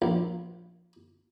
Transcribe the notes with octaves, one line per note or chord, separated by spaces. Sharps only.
A#1